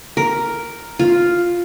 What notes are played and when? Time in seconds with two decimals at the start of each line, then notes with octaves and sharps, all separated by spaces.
0.17 A#4
0.99 F4